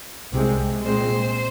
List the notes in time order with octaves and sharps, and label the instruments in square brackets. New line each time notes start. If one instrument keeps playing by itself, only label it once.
[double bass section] C2 C3 G#3 C4
[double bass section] A#2 G#3 C4 [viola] C5